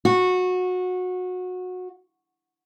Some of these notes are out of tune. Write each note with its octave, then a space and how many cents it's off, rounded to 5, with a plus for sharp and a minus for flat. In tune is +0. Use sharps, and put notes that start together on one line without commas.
F#4 -20